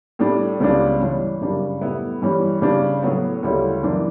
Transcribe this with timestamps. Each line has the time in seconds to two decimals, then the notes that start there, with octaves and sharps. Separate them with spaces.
0.19 A2 G3 D4
0.60 C#2 C#3 G3 B3 D4
1.00 G2 E3 G3 C#4
1.41 F#2 C#3 G3 D4
1.81 A2 G3 B3 E4
2.22 G2 E3 G3 C#4
2.62 C#3 G3 D4
3.02 A2 F#3 B3
3.43 D2 C#3 G3 C#4 E4
3.83 F#2 E3 B3 D4